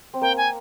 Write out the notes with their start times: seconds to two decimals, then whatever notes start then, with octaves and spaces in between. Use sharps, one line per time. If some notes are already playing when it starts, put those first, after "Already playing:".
0.14 C4
0.21 A#3 G5
0.37 G#5